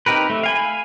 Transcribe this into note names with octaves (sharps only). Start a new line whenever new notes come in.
C4 D#4 G4 A#4 B4
A3
F5 G#5 B5